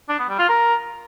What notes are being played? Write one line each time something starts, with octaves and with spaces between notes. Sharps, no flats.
D4
B3
G3
F4
A#4